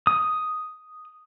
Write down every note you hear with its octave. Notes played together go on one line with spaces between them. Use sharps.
D#6